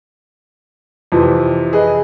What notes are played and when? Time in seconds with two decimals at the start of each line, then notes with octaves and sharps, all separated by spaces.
1.12 F2 C3 E3
1.73 G#4 B4 D#5